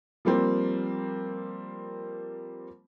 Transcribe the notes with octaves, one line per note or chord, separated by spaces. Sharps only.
F3 G3 A#3 C4